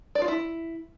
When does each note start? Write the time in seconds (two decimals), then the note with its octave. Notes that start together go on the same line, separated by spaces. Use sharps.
0.15 D5
0.22 F4
0.28 E4